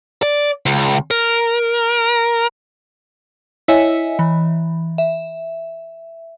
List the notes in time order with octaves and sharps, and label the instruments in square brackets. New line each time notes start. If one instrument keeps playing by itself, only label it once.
[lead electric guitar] D5
C#2
A#4
[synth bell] E4 C#5 D#5 E5 G#5
E3
E5